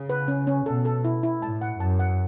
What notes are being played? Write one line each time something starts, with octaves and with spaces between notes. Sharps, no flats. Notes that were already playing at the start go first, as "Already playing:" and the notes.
Already playing: C#3
B4
C#4
C#4
B2 A4
A4
E4
E4
A2 A5
F#5
F#2 A5
F#5